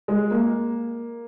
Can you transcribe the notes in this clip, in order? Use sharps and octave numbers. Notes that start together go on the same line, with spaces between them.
G#3
A#3